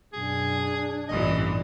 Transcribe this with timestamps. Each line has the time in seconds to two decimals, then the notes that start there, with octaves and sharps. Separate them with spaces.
0.13 F#2 B2 D4 G#4
1.09 A1 G2 A#2 E3 D#5